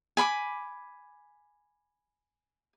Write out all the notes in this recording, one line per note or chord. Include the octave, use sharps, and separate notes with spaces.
G#5 B5 C6 D6